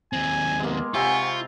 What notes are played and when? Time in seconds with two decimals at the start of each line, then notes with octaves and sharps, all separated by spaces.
0.13 D#2 C4 G#5
0.60 G#3 A#3 B3 G4
0.94 C3 C4 F4 F#5 G#5 B5 C#6